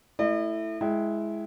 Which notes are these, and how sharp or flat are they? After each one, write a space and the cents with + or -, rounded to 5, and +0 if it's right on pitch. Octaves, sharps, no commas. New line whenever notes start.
A3 +0 E4 +0 D#5 -45
G#3 +15 E4 +0 G5 -15